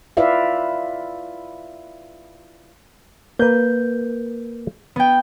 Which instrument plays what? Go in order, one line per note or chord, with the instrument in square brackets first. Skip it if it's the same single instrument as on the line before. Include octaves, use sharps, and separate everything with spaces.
[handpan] E4 F4 B4 D5 E5 F5
[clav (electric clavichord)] A#3 B4 [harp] G6
[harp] B3 G5